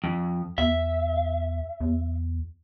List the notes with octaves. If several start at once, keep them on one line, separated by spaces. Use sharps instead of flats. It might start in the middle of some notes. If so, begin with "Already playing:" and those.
F2
E2 E5
E2